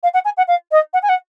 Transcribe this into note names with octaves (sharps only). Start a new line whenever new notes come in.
F5
F#5
G#5
F#5
F5
D#5
F#5
G#5
F#5